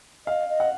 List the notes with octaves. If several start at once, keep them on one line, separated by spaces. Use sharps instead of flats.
D#5 F5
D#5
F#5